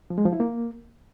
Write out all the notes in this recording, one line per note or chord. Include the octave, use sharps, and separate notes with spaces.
F3
G#3
F3
E4
A#3